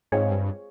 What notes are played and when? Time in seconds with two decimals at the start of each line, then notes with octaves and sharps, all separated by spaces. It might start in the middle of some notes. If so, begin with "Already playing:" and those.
0.12 G#2 G#3 C4 F4 G#4 C#5
0.31 G2